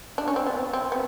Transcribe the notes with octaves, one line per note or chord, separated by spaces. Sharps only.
D4
C#4
C4
B3
C4
B3